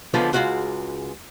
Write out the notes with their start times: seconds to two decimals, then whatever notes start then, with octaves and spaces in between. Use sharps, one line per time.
0.14 C#2 D3 F3 B3 F4
0.33 C#2 G#3 F4 F#4 F#5